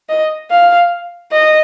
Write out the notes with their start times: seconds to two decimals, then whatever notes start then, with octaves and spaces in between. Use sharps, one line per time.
0.09 D#5
0.51 F5
1.32 D#5